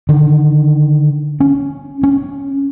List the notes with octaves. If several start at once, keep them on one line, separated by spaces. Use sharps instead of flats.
D3 D#3
C#4
C#4